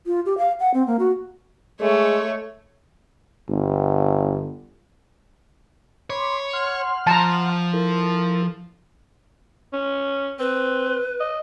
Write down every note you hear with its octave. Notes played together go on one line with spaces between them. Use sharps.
F4
G4
F5
F#5
C4
A#3
F#4
G#3 A3 C#5
G1
C#5 B5 C6 D6
F#5 C6 F6
F3 A5 A#5
E4 A4 A#4
C#4
C4 B4
D#5